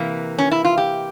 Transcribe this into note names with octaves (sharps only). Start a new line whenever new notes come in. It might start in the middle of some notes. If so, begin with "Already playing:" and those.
Already playing: C3 E3 A#3
C#4
E4
F4
G4